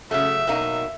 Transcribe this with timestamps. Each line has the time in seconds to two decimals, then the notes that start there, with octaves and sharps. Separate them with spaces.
0.11 C#3 F#3 A3 E5
0.47 B2 F#3 A#3 D#4